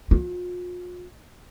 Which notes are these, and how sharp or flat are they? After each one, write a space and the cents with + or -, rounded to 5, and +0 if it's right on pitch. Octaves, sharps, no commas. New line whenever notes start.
F4 +40